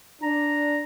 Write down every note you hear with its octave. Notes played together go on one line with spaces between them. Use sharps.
D4 A#5